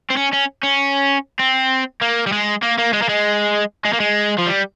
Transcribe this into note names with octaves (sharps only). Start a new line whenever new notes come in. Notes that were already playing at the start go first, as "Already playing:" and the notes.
C4
C#4
C#4
C#4
C4
A#3
G3
G#3
A#3
A#3
G#3
A#3
G#3
G#3
A#3
G#3
F3
G3